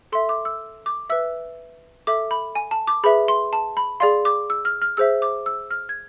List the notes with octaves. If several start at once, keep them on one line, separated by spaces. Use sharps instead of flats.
A4 E5 C6
D6
E6
D6
B4 E5 E6
A4 E5 D6
B5
G#5
A5
D6
G#4 B4 E5 B5
C6
A5
B5
G#4 D5 F5 C6
D6
E6
F6
F6
G#4 C5 E5 E6
D6
E6
F6
G#6